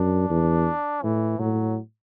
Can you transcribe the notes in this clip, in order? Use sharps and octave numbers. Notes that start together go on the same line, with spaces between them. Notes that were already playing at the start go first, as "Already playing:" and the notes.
Already playing: F#2 D4
E2
A2 E3
A2 F#3